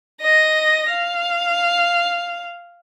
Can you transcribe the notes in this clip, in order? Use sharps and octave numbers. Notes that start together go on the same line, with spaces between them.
D#5 A#6
F5